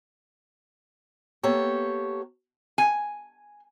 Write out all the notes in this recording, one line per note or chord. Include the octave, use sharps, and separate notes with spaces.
A#3 B3 G4 A4 C#5
G#5